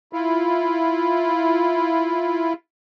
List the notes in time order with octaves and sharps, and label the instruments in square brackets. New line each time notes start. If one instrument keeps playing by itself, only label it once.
[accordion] E4 F4